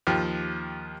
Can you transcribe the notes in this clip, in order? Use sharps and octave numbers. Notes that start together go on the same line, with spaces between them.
D#2 F3 G4